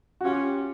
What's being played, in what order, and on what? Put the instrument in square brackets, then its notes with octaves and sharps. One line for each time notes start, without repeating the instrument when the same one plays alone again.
[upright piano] F#4
[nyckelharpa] C#4 [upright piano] F4 G4